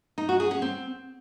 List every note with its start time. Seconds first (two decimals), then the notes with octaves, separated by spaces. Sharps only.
0.18 D#4
0.29 F#4
0.40 G#4
0.51 C#4
0.62 C4